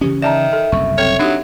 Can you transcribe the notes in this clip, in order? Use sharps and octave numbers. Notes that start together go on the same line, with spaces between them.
C#3 E3 C#4 G4
D#3 D5 E5 A5 A#5
A4
F#1 C2 F#2 C#6
C4 A4 C#5
F#3 D4 D#4 G4